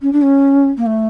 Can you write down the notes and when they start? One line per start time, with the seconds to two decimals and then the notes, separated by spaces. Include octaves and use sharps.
0.01 C#4
0.12 D4
0.22 C#4
0.77 A#3
0.86 A3